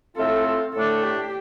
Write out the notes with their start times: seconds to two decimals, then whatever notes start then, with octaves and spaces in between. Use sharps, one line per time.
0.16 A2 A3 C4 F4 A4
0.73 A2 A3 D4 A4
1.03 G4